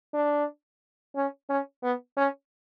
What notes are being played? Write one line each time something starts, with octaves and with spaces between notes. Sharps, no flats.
D4
C#4
C#4
B3
C#4